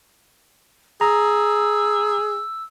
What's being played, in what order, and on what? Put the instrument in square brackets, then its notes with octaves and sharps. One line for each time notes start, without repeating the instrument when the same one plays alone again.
[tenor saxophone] G#4 [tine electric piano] A#5 [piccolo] E6